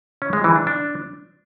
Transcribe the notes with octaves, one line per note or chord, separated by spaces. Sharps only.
C#4
G#3
E3
D4
D4